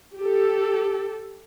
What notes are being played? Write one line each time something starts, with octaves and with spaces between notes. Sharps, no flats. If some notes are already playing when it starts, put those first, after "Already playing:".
G4 A4